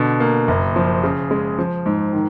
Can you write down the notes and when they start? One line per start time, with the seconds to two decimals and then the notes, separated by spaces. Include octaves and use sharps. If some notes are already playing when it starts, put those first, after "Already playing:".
Already playing: B2 D3
0.20 A#3
0.48 F#1
0.76 F3
1.04 C#3
1.31 G#3
1.58 F3
1.86 G#2
2.13 D#3